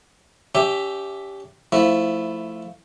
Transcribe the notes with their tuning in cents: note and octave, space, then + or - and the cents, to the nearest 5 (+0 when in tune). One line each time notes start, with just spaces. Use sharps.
C#4 +35 G4 +0 E5 +0
F3 +0 A3 +15 E4 +0